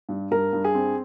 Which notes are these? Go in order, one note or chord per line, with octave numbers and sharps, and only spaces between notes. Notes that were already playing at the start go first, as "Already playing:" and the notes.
G2
G2 A#4
G2
G#4
C4